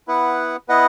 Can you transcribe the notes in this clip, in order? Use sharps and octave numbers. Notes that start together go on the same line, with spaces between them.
B3 E4 B4 F#5
B3 E4 B4 D#5 F#5